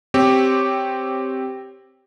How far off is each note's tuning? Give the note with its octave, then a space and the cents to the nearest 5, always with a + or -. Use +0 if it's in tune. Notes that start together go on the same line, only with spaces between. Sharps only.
C4 +0 G4 -5 C#5 +0